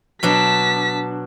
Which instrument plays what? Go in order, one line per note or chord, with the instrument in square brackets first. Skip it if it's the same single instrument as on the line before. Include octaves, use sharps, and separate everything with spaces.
[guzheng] B2 F#3 D4 [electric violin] A5 B6